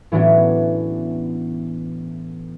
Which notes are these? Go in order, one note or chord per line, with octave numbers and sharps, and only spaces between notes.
A2 E3 B3 C#4 D4 F#4